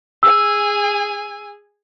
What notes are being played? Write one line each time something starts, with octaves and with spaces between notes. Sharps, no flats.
G#4 G#5 E6